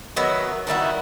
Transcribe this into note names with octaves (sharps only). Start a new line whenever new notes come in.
D#3 F#3 B3 E5
D#3 G3 E4 F#4